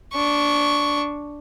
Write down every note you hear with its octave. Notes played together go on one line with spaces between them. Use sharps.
D4 C#6